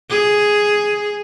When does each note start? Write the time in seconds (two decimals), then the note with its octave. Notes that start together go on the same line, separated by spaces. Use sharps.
0.10 G#4